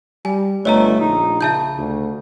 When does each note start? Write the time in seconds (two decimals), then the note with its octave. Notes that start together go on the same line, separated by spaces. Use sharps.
0.25 G3 G#5
0.65 G1 A3 C#5 D#5 A#5
1.00 A#1 D#4
1.41 C#3 E5 A5 G6
1.78 D2